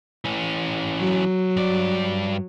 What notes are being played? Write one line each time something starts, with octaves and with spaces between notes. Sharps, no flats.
E3 C#4
F#3
G2 D5